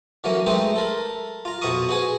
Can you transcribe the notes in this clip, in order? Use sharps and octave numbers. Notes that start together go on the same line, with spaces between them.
D3 E3 F#3 A#3 C#4
G#3 A3 C4 D#4 B4 C5
A4 A#4 B5
F4 A#5
F2 B2 F#5 B5 C#6 D#6
F#4 G#4 B4 F#5 G#5